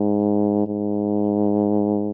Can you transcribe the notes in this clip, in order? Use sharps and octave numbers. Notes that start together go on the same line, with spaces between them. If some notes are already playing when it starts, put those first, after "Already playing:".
Already playing: G#2
G#2